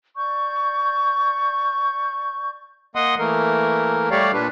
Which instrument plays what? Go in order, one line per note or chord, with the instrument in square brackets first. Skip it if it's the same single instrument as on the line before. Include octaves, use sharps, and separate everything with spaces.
[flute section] D5 C#6 G6
[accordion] A#3 D#5 F#5 C6 D#6
E3 A3 A#3 A#4
G3 A3 G4 C#5 D5 F5
A#2 D4 B4